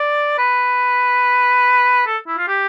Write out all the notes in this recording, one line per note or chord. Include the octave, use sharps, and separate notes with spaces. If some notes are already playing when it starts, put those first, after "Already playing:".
Already playing: D5
B4
A4
E4
F4
G4